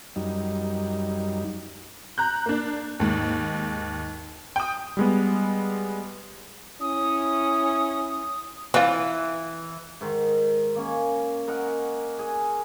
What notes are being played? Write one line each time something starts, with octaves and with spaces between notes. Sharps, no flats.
F#2 G3 D#4
A#5 F#6 G6
A#3 D4
D#2 G#2
G5 D#6
G3 G#3 B3
C#4 E4 D#6
E3 C4 F4
G#2 D#3
A#3 C#4
A#4 D#5 F#5
G#4